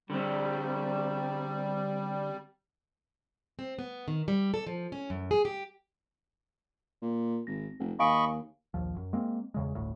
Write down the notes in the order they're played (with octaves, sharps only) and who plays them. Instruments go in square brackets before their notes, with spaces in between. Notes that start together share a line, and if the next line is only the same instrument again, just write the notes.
[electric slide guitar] D3 C4 [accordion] G3
[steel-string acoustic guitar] C4
B3
D#3
G3
A4
F3
C#4
F#2
G#4
G4
[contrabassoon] A#2
[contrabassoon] G#1 [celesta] A#6
[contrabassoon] F1
[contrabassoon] D#2 [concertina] D#5 B5 C#6 [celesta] F5 G#5 D7
[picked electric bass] A#1 D#2 F3
F#2
G#3 A#3 C4
E2 C#3 G#3
G1 D2 A2